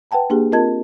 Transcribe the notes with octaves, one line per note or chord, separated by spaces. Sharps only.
B4 F#5 G5 A5 A#5
A#3 D4 G4 G#4
C4 F4 A#4 D#5 A5 G#6